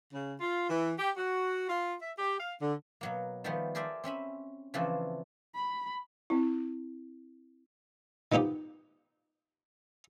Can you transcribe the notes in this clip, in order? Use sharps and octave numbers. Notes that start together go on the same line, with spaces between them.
C#3
F4
E3
G4
F#4
F4
E5
G4
F5
D3
B2 F#3 A#3
D#3 F3 G3 A3 B3
G#4 A#4 C5 D5 E5 A5
C4 C#4 E5 B5
C#3 E3 F3 A3 C4 D4
B5
C4 E4
D#3 F3 B3 D#4 G4